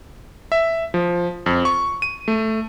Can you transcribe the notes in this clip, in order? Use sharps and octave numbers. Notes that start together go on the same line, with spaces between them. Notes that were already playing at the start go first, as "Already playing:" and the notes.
E5
F3
F2
C#6
D#7
A3